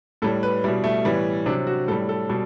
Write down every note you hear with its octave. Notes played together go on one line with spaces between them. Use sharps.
A2 G3 A4
B4
B2 G3 E4
A3
A2 E3 G3 B3
C3 F#3 D4
F#4
A2 G3 A4
A4
B2 G3 A4